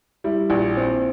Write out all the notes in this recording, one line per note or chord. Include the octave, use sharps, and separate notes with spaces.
G3 E4
A#1
C4